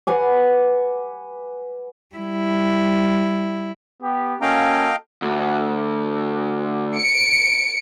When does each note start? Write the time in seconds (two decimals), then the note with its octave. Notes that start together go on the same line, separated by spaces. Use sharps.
0.07 B4 F#5 G#5 D6
2.15 G3 E4
4.03 B3 G4
4.42 A#3 C#4 F#4 A4 D#5 F5 G5
5.22 D2
6.97 C#7 D7